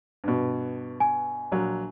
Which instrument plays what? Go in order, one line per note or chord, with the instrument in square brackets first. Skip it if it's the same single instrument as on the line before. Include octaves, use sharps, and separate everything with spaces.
[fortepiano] G2 B2
[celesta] G#5
[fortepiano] A#1 F#3